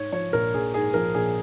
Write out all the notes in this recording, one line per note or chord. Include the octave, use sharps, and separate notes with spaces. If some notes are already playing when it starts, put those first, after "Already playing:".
Already playing: G#2 C#5
F3 C#5
A#1 A#4
A#1 G#4
G#2 G#4
F3 A#4
A#1 G#4